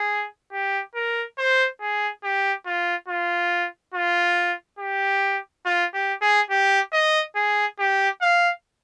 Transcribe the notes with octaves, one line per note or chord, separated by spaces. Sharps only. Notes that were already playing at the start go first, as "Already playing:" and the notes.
Already playing: G#4
G4
A#4
C5
G#4
G4
F4
F4
F4
G4
F4
G4
G#4
G4
D#5
G#4
G4
F5